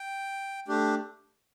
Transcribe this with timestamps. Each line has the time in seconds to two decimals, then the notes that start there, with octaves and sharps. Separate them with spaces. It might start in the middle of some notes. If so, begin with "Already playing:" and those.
Already playing: G5
0.68 A3 D4 G4